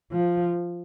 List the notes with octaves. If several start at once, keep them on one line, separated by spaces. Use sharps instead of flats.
F3